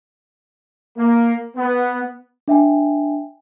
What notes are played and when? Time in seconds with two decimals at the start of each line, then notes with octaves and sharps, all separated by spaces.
0.98 A#3
1.57 B3
2.48 D4 E5 G5 G#5